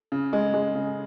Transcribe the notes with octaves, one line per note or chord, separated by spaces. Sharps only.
C#3
G#3
G#3
C#3